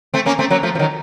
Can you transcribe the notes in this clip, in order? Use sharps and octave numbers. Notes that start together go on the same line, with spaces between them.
A3 C4
A#3 C#4
A3 C4
F#3 A#3
F3 A3
F3
D#3 F#3